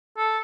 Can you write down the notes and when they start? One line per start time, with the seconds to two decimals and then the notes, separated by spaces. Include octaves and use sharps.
0.17 A4